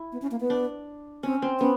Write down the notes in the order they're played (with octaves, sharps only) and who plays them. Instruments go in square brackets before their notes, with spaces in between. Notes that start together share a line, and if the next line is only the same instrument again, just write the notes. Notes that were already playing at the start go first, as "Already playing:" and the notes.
Already playing: [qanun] E4
[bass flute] B3
C#4
A#3
B3
[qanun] D4
[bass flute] C4 [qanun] C#4
[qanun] C4
[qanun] B3 [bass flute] C#4